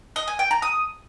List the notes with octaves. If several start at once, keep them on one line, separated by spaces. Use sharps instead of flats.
D#5
G#5
G5
A#5
D#6